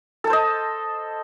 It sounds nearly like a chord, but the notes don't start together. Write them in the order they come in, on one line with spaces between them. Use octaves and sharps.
A4 A5 C5 D#5